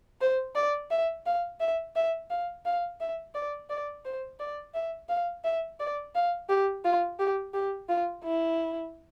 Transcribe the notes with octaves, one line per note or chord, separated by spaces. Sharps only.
C5
D5
E5
F5
E5
E5
F5
F5
E5
D5
D5
C5
D5
E5
F5
E5
D5
F5
G4
F4
G4
G4
F4
E4